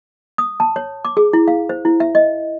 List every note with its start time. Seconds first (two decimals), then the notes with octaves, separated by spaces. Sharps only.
0.38 D#6
0.60 A5
0.76 C#5
1.05 D6
1.17 G#4
1.33 E4
1.48 F5
1.69 C5
1.85 E4
2.00 E5
2.15 D#5